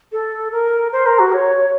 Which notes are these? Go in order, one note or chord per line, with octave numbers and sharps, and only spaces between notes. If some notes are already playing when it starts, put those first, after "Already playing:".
A4
A#4
C5
A#4
F#4
C#5